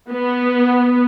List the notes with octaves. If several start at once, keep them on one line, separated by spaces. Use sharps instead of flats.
B3